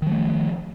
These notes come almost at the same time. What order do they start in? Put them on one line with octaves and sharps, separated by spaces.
D#3 F#3 A3 F3